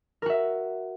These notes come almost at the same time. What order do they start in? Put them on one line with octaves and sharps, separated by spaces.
A#4 F#4 E5